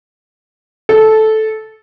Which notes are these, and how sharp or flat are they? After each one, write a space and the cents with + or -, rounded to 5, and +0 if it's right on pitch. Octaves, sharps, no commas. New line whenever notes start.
A4 -10